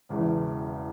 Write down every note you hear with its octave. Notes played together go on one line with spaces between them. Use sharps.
E1 E2 C#3 E3